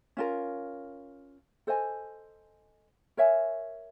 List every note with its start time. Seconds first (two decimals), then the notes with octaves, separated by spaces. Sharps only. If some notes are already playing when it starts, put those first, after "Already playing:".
0.17 C#4 F4 A#4
1.67 A4 C5 D#5 G#5
3.17 A#4 C#5 E5 G#5